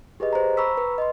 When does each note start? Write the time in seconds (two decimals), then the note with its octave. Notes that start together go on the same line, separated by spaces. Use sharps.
0.20 G4 G#4 B4 D#5
0.33 C5 A#5
0.57 A#5 B5 C#6 D6 E6 B6
0.77 B4
0.98 D#5 C6